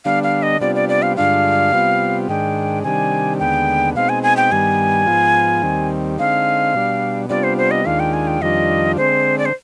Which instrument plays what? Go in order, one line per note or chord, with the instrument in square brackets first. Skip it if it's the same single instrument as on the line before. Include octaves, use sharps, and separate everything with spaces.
[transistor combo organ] D3 G3 B3 D4 [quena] F5
[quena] F5
D#5
[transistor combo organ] C3 G3 B3 D4 F4 [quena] D5
[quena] D5
D5
F5
[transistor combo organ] G2 D3 G#3 D4 F4 [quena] F5
[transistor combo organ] C3 G3 B3 F4
[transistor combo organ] G#2 D#3 G#3 D4 [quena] G5
[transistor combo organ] C3 D#3 G3 D4 [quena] G#5
[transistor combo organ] D#2 D3 G#3 B3 [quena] G5
[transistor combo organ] B2 G#3 C4 D#4 [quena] F5
[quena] G#5
G#5
G5
[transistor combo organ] G2 D#3 G3 B3 [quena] G#5
[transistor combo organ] G#2 F3 B3 F4
D#2 D#3 G3 C4
[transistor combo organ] D3 G#3 C4 D#4 [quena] F5
[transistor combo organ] B2 G3 D4
[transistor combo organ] C3 G3 B3 D4 F4 [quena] D5
[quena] C5
C5
D#5
[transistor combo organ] D#2 D#3 G#3 D4 F4 [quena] F5
[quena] G5
G#5
G5
[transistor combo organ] F2 D#3 G3 D4 F4 [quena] D#5
[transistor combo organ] D3 G#3 C4 [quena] C5
[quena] D5
C5